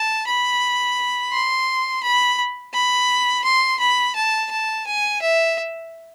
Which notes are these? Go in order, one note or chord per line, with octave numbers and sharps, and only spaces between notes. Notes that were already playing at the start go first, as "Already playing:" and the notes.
Already playing: A5
B5
C6
B5
B5
C6
B5
A5
A5
G#5
E5